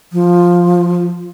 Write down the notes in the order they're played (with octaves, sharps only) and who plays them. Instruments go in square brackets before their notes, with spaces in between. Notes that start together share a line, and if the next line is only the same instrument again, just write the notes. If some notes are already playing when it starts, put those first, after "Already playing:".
[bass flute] F3